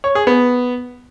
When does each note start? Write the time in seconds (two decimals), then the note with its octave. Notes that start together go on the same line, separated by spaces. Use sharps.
0.04 C#5
0.15 G#4
0.27 B3